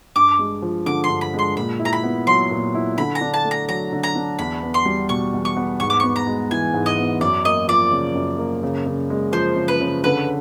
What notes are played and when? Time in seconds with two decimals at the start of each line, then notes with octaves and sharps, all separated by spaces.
0.16 G2 D6
0.39 G#3
0.62 F3
0.86 D3 D6
1.04 C6
1.09 G2
1.21 B5
1.34 G#3 C6
1.57 A#2 B5
1.80 E4
1.85 A#5
1.93 B5
2.03 B3
2.27 F#3 C6
2.51 A#2
2.75 E4
2.98 D3 B5
3.15 A#5
3.21 D4
3.34 A5
3.45 A3
3.51 A#5
3.69 F#3 A#5
3.93 D3
4.03 A#5
4.16 D4
4.39 E2 B5
4.63 B3
4.74 C6
4.85 G3
5.09 B2 C#6
5.34 E2
5.45 C#6
5.57 B3
5.80 G#2 C#6
5.90 D6
6.00 B3 C#6
6.16 A#5
6.27 G#3
6.51 E3 G#5
6.74 G#2
6.86 D#5
6.98 B3
7.21 F#2 D5
7.45 A#3 D#5
7.68 F3 D5
7.91 C#3
8.15 F#2
8.39 A#3
8.63 C#3
8.86 C#3
9.10 G#3
9.32 F3 C5
9.56 C#3
9.68 B4
9.81 C#3
10.04 D3 B4